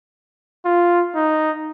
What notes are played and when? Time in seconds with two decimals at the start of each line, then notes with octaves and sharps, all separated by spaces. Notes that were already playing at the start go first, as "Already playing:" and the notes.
0.65 F4
1.15 D#4